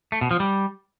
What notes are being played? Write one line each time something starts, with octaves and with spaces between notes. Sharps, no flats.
A3
B2
F3
G3